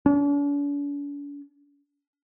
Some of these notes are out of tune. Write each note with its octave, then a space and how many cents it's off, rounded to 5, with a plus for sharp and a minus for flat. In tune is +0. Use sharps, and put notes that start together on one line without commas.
D4 -45